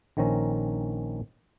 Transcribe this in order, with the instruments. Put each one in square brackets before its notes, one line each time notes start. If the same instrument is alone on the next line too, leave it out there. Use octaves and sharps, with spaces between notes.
[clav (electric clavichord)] A#1 D#3 C4 C#4 A#5